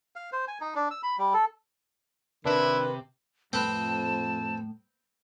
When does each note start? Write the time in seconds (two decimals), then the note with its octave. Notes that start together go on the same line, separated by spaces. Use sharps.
0.16 F5
0.33 C5
0.48 G#5
0.61 D#4
0.75 D4
0.91 E6
1.03 B5
1.18 G3
1.34 A4
2.46 C3 D#3 D4 E4 B4
3.53 F2 A2 C4 B4 A5